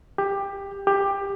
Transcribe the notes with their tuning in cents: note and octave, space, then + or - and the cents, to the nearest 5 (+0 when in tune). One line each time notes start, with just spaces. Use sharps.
G4 +15
G4 +15